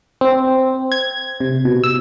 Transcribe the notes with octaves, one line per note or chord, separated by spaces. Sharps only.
C4
G#6
C3
B2
E6